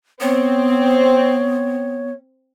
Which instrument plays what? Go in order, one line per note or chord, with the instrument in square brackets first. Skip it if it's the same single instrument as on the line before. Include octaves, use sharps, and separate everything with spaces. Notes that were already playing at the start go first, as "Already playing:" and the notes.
[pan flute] B3 [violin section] C4 [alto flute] C#5